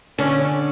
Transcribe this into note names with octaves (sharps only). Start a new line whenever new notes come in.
D3 C#4